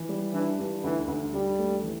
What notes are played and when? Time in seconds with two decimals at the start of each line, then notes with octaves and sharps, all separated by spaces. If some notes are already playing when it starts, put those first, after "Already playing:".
Already playing: E3
0.09 G3
0.33 E3 D4
0.58 G2
0.84 D2 E3
1.08 D2
1.33 D2 G3
1.59 A3
1.83 E3